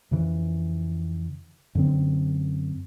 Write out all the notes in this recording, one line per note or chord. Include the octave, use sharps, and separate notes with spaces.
F2 C#3 E3
F#2 D3 C4